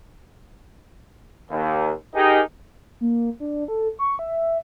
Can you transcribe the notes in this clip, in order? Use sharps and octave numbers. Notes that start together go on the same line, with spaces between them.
D#2
D#4 G4 G#4 A#4
A#3
D4
A4
C#6
E5